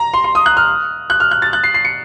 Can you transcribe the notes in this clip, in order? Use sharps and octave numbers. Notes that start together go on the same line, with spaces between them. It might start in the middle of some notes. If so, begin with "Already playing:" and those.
Already playing: A#5
C6
C6
D#6
F#6
F6
F#6
F6
F#6
A6
F#6
C7
C7
C#7